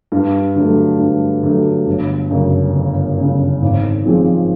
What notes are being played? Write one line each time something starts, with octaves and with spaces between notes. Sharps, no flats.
G2
D3 F#3 A3
G2
D3 F#3 A3
G1
F#2 C#3
G1
F#2 C#3
G#1
G#2 F3 G#3 C4